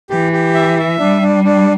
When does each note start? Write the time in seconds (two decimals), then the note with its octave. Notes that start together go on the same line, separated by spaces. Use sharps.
0.10 E3 G4
0.32 G4
0.55 E5
0.78 E5
0.99 G3 D4
1.22 D4
1.44 D4